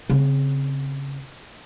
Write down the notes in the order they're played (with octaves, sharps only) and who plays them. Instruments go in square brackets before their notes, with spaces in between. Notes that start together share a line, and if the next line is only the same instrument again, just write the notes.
[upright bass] C#3 C4